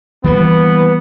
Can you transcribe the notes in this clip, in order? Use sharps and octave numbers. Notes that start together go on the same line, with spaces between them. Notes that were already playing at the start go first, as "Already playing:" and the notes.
E3 G3 A#3 B3